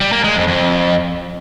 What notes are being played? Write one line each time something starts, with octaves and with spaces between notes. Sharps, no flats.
G3
A#3
G#3
F2
F2